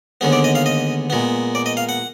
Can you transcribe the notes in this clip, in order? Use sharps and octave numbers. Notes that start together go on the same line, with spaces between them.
D#2 D3 G#3 B3
D5
D#5
F5
D#5
A#2 G#3 B3
D5
D#5
F5
F#5